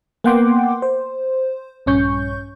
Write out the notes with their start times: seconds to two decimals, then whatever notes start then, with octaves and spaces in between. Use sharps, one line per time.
0.24 A#3 B3 F#5 G5 C6 D6
0.82 C5
1.86 A#1 G2 C#4 C#6 G6